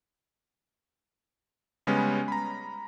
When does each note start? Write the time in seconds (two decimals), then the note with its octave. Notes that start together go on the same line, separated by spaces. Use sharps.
1.87 C#3 G3 G#3 B3 C#4
2.28 A#5 B5